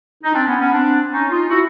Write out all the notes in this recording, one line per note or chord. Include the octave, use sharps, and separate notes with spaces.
D#4
C4 D4
B3 C#4
B3 C#4
C4 D4
C#4 D#4
D#4 F4
E4 F#4